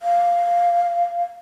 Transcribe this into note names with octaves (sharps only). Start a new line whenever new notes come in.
F5